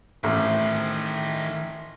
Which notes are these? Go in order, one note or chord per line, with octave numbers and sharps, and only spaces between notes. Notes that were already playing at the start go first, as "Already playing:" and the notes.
A1 A2 D#3 C5